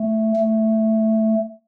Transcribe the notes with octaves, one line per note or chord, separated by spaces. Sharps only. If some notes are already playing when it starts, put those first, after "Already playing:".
Already playing: A3
A3